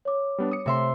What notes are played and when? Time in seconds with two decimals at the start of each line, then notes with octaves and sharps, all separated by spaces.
0.05 C#5 D6
0.38 G3 B3 D4
0.52 D#6 C#7
0.66 C3 A3 E5 C6